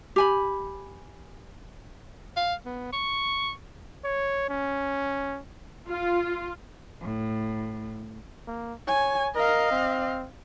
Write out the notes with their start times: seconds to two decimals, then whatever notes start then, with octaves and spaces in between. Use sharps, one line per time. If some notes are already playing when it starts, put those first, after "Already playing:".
0.16 G4 G#5 B5
2.37 F5
2.66 B3
2.93 C#6
4.05 C#5
4.49 C#4
5.89 F4
7.02 A2
8.48 A#3
8.88 C#5 G#5
9.36 A#4 D#5 F5
9.71 C4